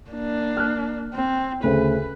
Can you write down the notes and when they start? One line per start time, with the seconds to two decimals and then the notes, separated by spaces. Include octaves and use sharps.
0.11 A#3 D4
0.57 F6 F#6
1.14 C4
1.63 D2 C#3 B4 C5